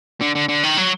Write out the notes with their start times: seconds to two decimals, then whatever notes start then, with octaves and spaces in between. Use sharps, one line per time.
0.21 D3
0.35 D3
0.49 D3
0.63 D#3
0.77 F#3